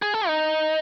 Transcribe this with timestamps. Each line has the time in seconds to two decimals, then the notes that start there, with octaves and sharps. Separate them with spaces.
0.02 G#4
0.14 A4
0.27 D#4